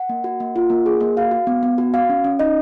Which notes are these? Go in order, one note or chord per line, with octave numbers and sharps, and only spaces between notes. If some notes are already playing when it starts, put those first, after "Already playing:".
Already playing: F#5
A#3
F#4
A#3
F4
A#3
G#4
A#3
F#4 F5
F#4
B3
B3
F#4
F#4 F5
C#4
C#4
D#4 D#5